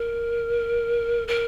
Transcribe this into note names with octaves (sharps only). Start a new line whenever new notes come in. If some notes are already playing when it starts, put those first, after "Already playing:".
Already playing: A#4
A#4